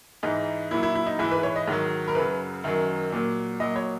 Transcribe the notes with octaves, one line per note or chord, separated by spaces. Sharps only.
G#2 E3 D#4
A#2 F#3 E4
E4
E4
D#4
G#2 E3 E4
B4
C#5
D#5
G#2 D#3 F#3
A#4
F#2 C#3 F#3 B4
F#2 D#3 F#3
A#2 F#3
A#2 F#3 D#5
C#5